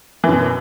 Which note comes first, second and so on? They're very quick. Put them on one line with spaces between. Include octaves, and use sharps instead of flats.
E3 F#2 B2